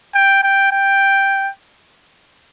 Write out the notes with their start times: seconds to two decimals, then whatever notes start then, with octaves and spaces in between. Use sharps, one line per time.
0.14 G5
0.43 G5
0.72 G5